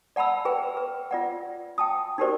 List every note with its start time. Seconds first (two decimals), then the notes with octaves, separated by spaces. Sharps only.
0.16 D5 F#5 A5 B5 E6
0.45 G#4 B4 G5
0.77 B4
1.11 F4 D5 F#5
1.78 G5 A5 D#6
2.18 D#4 F#4 G4 A#4 C5 D5